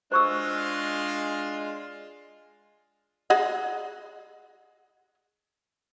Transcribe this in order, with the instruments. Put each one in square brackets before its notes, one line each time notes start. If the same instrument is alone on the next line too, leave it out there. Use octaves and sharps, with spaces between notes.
[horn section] G#3 D4 F4 [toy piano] C5 C#6 E6
[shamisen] G#4 D#5 F#5